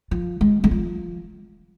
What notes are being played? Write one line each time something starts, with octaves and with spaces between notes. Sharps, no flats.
F3
G#3
G#3
F3